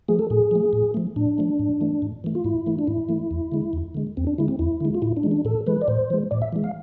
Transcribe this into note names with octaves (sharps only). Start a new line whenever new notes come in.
F3 A3 G#4
A4
A2 G#4
F3 A3
A2
F3 A3
A2 D4
F3 A3
G#2
E3 A3
G#2
E3 A3
F4
G#2 E4
E3 A3
D4
G#2 E4
E3 A3
E2
D3 G#3
E2
D3 G#3
E2 C4
D4
D3 G#3 E4
C4
E2 E4
D3 G#3
F4
A2 E4
D4
E3 G#3
D4
A2 A4
E3 G#3 B4
D5
A2 C5
E3 G#3
A2 D5
E5
E3 G#3
F5